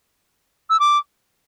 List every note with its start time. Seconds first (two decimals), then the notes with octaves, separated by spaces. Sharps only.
0.70 E6
0.80 D6